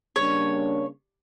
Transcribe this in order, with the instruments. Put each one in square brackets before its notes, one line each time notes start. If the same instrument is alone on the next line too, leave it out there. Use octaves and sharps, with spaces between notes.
[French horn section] C#3 G3 A#3 D4 [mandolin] C#5